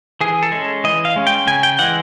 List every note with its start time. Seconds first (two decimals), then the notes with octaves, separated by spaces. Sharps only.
0.21 E3 G#4
0.43 A4
0.52 G#3 C#4
0.84 E3 D#5
1.05 F5
1.16 G#3 C#4
1.27 G5
1.47 C#3 G#5
1.63 G5
1.79 E3 G#3 F#5